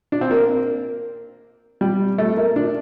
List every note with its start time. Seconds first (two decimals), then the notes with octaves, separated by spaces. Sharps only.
0.12 D4
0.21 C4
0.31 A#3
1.81 G3
2.18 A3
2.37 A#3
2.56 D4